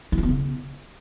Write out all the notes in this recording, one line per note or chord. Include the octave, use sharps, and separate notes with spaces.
E4
A#3
B3
C#3